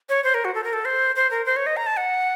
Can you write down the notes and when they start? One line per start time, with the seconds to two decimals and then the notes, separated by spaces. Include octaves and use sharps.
0.09 C#5
0.24 C5
0.34 A#4
0.45 F#4
0.55 A4
0.64 A#4
0.73 A4
0.85 C5
1.16 C5
1.31 A#4
1.46 C5
1.56 C#5
1.66 D#5
1.77 A#5
1.86 A5
1.97 F#5